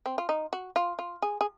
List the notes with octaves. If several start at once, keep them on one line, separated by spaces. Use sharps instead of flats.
C4
F4
D#4
F#4
F4
F4
G#4
G#4